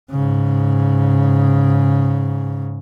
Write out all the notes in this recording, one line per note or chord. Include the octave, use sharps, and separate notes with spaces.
G#2 C#3